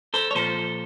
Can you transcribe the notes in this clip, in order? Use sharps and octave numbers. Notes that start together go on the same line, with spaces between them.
A4 C5
C#5
A#2 F3 A4 C5